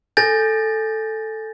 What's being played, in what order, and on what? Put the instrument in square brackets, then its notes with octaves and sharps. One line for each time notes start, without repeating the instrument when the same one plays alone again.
[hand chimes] A4 G6 [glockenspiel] G#5 A6 A#6